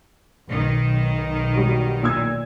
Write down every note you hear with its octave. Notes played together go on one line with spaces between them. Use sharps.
B1 D#3
G3 F#4
A#2 E6 G#6